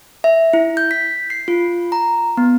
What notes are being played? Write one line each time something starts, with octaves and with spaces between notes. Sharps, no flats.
E5
E4
G6
B6
C7
F4
A#5
B3